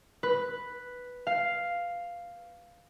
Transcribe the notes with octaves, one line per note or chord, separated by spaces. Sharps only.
B4
F5